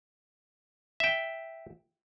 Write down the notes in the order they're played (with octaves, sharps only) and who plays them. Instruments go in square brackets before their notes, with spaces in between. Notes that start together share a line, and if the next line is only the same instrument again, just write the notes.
[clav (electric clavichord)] E5 G5